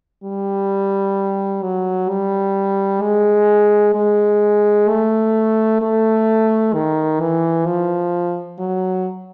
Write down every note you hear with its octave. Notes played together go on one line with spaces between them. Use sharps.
G3
F#3
G3
G#3
G#3
A3
A3
D#3
E3
F3
F#3